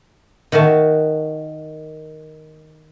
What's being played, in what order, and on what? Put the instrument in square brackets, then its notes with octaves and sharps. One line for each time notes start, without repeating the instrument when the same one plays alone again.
[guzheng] D#3 F#4 E5 A5